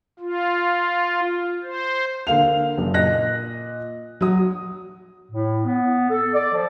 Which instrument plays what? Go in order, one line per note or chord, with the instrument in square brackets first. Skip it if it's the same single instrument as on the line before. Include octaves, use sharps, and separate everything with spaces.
[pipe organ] F4
C5
[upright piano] D3 A#3 F5 F7
F#1
A#2 D#5 F#6 A#6
F#3 D#6
[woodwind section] A2
B3
A4
D5
F3